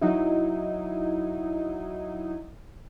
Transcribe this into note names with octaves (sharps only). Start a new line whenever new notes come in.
F#3 D#4 E4